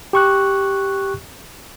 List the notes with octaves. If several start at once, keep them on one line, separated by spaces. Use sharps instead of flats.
G4 C#6 F#6